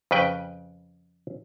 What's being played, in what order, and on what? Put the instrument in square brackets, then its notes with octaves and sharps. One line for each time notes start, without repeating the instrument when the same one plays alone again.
[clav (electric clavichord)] F2 C#3 B4 G5